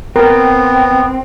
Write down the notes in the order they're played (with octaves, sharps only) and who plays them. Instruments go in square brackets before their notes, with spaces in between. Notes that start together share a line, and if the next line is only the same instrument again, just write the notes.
[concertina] B3 [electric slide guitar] C4 [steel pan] A#4 [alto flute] G5